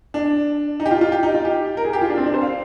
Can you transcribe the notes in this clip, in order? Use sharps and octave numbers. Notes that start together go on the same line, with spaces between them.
D4
D#4
G4
F4
F4
G4
D#4
F4
G4
A#4
G#4
G4
F4
D4
C4
D4
C5
F5